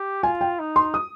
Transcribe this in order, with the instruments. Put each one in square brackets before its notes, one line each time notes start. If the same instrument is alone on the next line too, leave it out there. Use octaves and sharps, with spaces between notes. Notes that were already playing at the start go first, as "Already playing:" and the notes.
Already playing: [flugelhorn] G4
[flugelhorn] F4 [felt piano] G#5
[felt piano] G5
[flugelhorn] D#4
[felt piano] C6
D#6